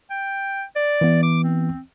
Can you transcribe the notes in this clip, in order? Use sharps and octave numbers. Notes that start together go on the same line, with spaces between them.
G5
D5
E3 B3
D6
C4